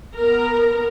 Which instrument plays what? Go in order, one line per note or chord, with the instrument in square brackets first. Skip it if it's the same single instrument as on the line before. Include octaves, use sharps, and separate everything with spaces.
[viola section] B3 A#4 A#5